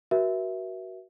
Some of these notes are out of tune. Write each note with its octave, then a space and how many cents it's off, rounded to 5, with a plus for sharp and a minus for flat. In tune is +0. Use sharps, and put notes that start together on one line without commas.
F#4 +20 A#4 +45 E5 +0